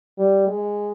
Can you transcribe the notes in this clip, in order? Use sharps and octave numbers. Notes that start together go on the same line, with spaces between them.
G3
G#3